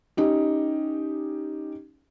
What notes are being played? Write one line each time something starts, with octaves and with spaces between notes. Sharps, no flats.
C#4 D#4 G4